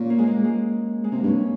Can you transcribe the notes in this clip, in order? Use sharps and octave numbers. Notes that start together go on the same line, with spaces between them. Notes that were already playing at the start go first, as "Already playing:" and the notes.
Already playing: A#2 C#4 F4
A#3
G#3
A#3
G#3
G#3
C3 A#3
G2
C#4